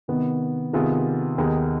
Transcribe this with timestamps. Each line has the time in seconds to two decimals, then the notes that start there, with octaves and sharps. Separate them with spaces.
0.08 C3 D#3 B3
0.73 C3 D#3 B3 F4 G#4
1.38 D#2 D#3 B3 D#4 G#4